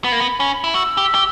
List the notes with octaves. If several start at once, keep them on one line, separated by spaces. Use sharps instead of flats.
B3 B5
A#3
B3
C#4
E4
F#4 E6
G4
G4